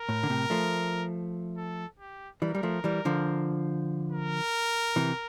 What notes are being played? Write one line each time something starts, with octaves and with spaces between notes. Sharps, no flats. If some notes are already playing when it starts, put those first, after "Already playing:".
Already playing: A#4
A2
D3
A2 C3
F3 A3
A4
G4
E3 G3 A#4
G3
F3 A3
E3 G3
D3 F3
A#4
C3 E3